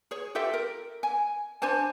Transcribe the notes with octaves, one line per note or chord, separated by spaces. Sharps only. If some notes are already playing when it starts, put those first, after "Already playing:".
G#4 C#5
F4 G4 A4 E5
A#4
G#5
D4 C5 G#5 A5